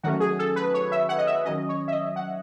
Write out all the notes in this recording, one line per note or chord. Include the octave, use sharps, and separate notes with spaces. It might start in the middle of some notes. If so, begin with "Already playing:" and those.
D#3 F#3 A3 C#4 F#4
G#4
A4
B4
C#5
E5
F#5
D#5
E5
D#3 F#3 C#4 D#5
C#5
E5
D#5
F#5